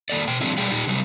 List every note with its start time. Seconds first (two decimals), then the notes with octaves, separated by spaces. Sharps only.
0.10 D#3 A#3 A4 D5
0.28 B2 G5
0.41 E3 F#3 G#3 C4 D4 E4
0.58 B2 G3 G#4 D5 G5
0.70 A#2 D#4 G4 G5
0.87 C3 F#3 G3 F#4